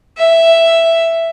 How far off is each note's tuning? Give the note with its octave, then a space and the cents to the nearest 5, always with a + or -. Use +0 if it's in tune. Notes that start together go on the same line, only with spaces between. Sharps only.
E5 +5